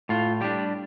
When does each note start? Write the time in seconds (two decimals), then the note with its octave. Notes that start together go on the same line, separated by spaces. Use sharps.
0.09 A2 F4
0.41 G3 D4 G4